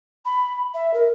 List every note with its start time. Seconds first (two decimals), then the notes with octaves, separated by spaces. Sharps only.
0.25 B5
0.74 E5
0.93 A#4